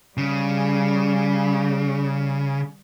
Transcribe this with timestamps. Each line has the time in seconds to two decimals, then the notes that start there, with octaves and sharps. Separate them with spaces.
0.17 C#3 G3